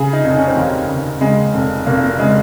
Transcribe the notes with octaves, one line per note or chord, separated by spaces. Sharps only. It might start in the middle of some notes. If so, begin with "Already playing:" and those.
Already playing: C#3 G#4
D#4
F1 D#4
C#4
C4
D#2 A#3
C#3
C#3 G#3
F1
F1 A#3
A#3
C#3 G#3